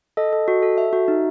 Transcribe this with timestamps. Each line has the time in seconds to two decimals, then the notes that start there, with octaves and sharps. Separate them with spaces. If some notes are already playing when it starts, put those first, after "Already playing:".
0.17 A4 D#5
0.33 A4
0.48 F#4
0.62 A4
0.78 A4 E5
0.93 F#4
1.08 D#4